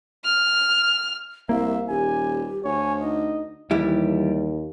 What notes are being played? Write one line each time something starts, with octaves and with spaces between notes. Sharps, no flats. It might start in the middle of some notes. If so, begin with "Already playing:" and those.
F6
C2 A#3 E5 F5
D#1 G4 G#5
D2 C#5 G#5
D#4 D#5
D#2 E3 G3 E4